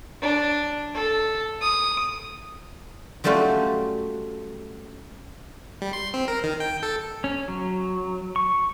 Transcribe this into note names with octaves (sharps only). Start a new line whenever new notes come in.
D4
A4
D#6
F#3 G3 A3 C#4 F4 F#4
G3
C6
C4
A#4
D#3
G5
A4
C#4
F#3
C#6